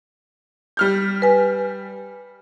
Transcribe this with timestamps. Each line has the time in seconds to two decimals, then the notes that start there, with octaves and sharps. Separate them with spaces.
0.77 G3 F6 G6
1.22 B4 G#5